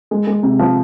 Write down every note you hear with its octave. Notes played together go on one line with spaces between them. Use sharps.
G#3
G#3
C3
F3